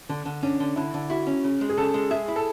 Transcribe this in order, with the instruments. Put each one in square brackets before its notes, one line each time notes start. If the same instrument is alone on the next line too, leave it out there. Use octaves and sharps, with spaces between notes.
[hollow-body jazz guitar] D3
D3
[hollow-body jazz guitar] C#4 [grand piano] D4
[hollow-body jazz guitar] D3
[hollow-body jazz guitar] D3 [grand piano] E4
[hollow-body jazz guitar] D3
[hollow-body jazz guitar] E4 [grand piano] F#4
[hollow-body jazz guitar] C#4
C#3
G#3
[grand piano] G#4
[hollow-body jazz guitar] C#3 [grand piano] A4
[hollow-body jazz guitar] G#3
[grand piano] G#4 [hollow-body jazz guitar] E5
[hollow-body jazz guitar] E4
[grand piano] A4